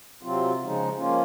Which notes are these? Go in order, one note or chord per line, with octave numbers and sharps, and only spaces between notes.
C3 F#3 C4 F4
C#3 F3 G#3 D#4
F3 A#3 C#4 F4